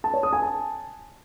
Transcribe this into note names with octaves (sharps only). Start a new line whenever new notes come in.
A5
C#5
D#6
G#5
A5